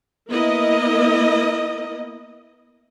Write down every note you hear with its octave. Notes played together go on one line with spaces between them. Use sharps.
A#3 B3 E4 A#4 D#5